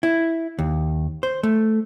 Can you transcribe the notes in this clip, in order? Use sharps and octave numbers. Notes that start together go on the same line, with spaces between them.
E4
D#2
C5
A3